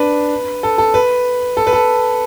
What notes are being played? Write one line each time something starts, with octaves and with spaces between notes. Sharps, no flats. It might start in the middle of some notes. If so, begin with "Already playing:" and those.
Already playing: D4 B4
A4
A4
B4
A4
B4
A4